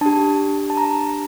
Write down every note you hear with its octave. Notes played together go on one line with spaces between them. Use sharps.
D4 G4 A5
A5
A#5